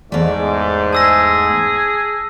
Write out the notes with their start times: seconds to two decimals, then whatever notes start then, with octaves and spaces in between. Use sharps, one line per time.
0.12 E2 G#2 A3 D5
0.93 G#4 A5 E6 A#6